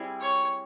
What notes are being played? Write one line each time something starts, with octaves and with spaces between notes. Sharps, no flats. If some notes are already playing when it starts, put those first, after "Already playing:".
Already playing: G3 C4 E4 G#4
C#5